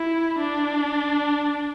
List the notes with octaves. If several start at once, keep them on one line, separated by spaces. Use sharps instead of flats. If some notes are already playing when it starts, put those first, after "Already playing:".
Already playing: E4
D4